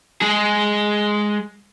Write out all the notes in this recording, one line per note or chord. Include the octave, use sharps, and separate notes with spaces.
G#3 G#4